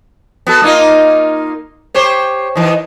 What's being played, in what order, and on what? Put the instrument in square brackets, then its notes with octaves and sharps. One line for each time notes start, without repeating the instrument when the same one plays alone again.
[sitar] B3 F#4 A4
A#3 D#4 F4
G4 C5 C#5
D#3 E3